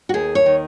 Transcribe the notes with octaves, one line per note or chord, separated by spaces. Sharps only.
F#4
D#2 G#4
C#5
D#3